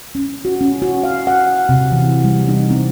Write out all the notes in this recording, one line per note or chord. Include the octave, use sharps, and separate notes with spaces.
C#4
F#4
C#4
F#4
F5
F#5
C3
E3
G3
D#4
C4